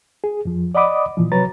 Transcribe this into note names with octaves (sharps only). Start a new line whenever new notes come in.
G#4
F2 F3
D5 D#5 F#5 B5 D6 D#6
A#2 E3 F3
C3 F#3 B4 C#5 A#5 A6